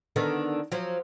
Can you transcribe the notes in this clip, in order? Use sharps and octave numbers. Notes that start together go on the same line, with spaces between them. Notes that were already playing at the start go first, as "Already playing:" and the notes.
D3 D#3 B3
F3 F#3